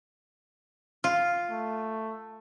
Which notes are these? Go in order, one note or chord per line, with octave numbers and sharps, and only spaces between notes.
F4
A3